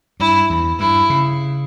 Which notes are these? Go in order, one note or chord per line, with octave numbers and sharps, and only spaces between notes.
G2 E4
E2
G2 E4
C#3